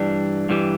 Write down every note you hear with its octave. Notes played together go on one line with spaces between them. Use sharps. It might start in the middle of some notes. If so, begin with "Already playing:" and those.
Already playing: G2 E3 G3 D4
G2 E3 G3